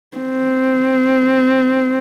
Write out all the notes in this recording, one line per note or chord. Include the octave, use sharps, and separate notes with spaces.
C4